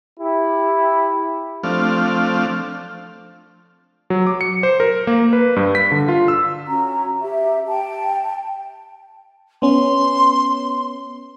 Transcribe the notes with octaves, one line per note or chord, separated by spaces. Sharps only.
E4 G4
F3 A3 C4 D4 F5
F#3
D6
C#7
C5
A#4
A#3
B4
G2
B6
D3
F4
E6
C#4 F#4 A#5
G4 E5
G5 A5
B3 C#4 C6